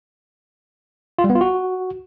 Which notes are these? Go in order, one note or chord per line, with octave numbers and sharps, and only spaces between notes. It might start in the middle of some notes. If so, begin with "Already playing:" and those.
F4
G3
B3
F4
F#4